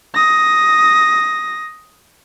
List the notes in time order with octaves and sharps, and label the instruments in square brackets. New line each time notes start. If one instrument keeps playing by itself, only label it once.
[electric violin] D#6 A#6